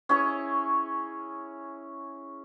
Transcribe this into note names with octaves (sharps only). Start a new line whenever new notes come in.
C#4 E4 G#4 C#5